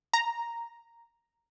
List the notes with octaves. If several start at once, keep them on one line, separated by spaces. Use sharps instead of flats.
A#5